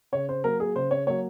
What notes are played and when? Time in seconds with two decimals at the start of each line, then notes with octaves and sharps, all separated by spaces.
0.12 C#3 C#5
0.29 C5
0.44 F#3 A#3 A#4
0.60 G#4
0.75 C#3 C5
0.91 C#5
1.07 F#3 A#3 C#5